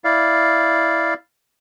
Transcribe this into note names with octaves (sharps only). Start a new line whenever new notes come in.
E4 D5 F5